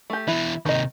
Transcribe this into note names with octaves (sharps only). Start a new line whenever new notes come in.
A3 G4
B2 E3 E4
D#2 C3 D#3 D#5